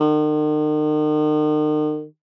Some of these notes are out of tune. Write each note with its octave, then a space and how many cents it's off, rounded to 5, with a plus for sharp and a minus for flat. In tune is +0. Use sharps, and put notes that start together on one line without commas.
D#3 -40